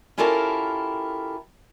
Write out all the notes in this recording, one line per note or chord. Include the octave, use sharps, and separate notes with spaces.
C#4 E4 F4 G4 A4 A#4